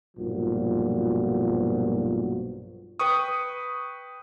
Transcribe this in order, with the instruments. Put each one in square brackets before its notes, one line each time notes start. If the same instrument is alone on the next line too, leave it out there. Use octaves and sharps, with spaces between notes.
[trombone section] B1 G2 A#2 F3 F#4
[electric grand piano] B4 G5 C#6 D#6